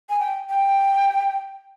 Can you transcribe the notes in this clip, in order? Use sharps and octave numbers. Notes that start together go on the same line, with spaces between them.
G#5
G5
G5